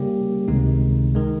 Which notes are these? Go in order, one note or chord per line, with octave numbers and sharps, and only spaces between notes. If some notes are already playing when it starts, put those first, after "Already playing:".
Already playing: C#3 G3 A#3 C#4 G4
C#2 C3 D#3 G#3 D#4
D#3 G#3